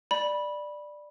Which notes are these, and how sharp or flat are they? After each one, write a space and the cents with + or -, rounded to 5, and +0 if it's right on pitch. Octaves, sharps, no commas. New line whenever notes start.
D5 +10 B5 -15